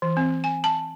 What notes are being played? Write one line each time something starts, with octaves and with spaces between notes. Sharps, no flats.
E3
C4
G#5
A5